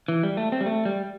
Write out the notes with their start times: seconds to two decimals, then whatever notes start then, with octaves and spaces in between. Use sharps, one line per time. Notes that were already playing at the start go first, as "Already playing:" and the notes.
0.08 E3
0.23 G3
0.37 A3
0.52 C4
0.61 G3
0.66 A3
0.85 G3